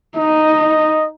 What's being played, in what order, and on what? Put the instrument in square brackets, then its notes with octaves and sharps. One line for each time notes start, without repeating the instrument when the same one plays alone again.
[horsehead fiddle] D#4 [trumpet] D#5